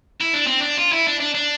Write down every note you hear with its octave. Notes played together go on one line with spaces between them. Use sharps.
E4
D4
C4
D4
F4
E4
D4
D4
D4